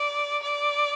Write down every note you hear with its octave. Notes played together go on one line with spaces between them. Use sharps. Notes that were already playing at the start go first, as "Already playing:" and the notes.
Already playing: D5
D5